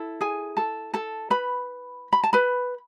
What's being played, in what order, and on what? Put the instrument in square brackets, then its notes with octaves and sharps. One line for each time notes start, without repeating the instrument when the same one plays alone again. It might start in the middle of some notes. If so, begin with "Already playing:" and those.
Already playing: [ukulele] E4 A4
G#4 G#5
A4 A5
A4 A5
B4 B5
B5
A5
B4 B5